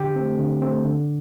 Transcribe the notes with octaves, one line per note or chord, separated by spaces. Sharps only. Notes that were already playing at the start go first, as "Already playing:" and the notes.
Already playing: D3 G4
A3 C4
D3
A3 C4
D3